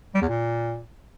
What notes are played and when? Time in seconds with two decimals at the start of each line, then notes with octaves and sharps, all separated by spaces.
0.14 G3
0.21 E2
0.28 A#2